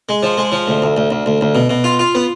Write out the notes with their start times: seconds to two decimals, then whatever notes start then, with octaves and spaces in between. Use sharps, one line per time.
0.09 G#3
0.23 F3
0.38 G#3
0.52 F3
0.67 D2
0.82 D2
0.97 D2
1.11 D2
1.26 D2
1.41 D2
1.55 B2
1.69 B2
1.84 F4
1.99 F4
2.15 B3